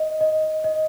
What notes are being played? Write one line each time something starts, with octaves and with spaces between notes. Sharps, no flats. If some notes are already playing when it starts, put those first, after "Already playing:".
Already playing: D#5
D#5
D#5